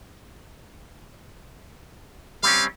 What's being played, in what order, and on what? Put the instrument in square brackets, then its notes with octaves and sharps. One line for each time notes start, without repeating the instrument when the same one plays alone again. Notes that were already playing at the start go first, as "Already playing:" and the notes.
[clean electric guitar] G3 C4 C#4 [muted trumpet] F5